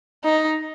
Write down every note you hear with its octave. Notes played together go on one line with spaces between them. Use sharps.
D#4